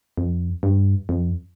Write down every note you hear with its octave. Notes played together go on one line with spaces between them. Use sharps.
F2
G2
F2